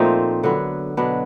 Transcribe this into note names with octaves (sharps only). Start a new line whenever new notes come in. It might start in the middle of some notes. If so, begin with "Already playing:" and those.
Already playing: A#2 F3 A3 C4 D#4
D3 F#3 B3
B2 F#3 B3 D4